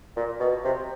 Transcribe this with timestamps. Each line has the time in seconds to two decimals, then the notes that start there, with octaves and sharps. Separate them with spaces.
0.16 A#2
0.40 B2
0.64 C3